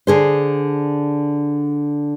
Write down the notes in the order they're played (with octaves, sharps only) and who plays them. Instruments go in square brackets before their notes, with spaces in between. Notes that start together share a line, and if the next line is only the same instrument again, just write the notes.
[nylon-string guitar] D3 G#4 C5